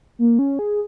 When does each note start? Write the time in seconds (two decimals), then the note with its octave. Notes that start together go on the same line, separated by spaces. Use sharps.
0.19 A#3
0.39 C#4
0.59 G#4